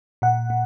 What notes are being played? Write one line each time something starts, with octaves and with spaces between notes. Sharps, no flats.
A#2 F#5
A#2